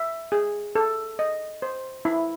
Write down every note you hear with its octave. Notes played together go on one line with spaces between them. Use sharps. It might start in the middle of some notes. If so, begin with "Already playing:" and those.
Already playing: E5
G#4
A4
D#5
C5
E4